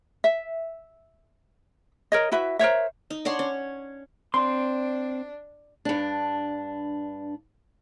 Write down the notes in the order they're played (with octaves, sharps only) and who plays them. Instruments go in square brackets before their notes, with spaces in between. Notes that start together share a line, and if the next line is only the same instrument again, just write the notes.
[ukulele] E5
A#4 C#5 D#5
E4 F#4 B4 E5
A#4 C5 C#5 E5
[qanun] D#4
D4 C#5 F#5 C6
C#4
[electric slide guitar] C4 [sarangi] D4 [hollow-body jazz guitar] C6
[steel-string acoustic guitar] G2 D4